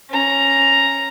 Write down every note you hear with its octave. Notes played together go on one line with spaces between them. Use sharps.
C#4 A#5